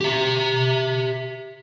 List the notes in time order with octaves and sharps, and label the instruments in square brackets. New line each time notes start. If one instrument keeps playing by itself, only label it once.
[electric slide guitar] G4 E5